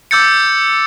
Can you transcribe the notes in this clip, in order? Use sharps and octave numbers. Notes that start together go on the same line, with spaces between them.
D6 E6 G6 A6 C#7